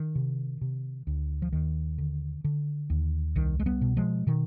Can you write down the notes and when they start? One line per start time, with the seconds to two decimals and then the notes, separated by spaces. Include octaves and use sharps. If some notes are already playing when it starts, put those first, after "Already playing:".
Already playing: D#3
0.15 C3
0.61 C3
1.07 D2
1.42 F3
1.52 D#2 D#3
1.98 D3
2.44 D3
2.90 D#2
3.36 C2 D#3
3.60 G#3
3.66 G3 B3
3.81 B2
3.97 F3 G#3
4.27 B2 D#3